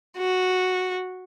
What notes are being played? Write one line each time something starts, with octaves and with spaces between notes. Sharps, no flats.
F#4